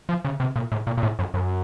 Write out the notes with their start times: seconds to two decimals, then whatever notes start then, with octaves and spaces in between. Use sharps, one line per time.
0.09 F3
0.25 C#3
0.40 C3
0.56 A#2
0.72 A2
0.87 A#2
0.97 A#2
1.03 A2
1.19 F#2
1.34 F#2